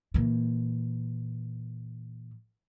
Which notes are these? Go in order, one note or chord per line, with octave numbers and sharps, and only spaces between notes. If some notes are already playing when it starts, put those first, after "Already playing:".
A#2 E3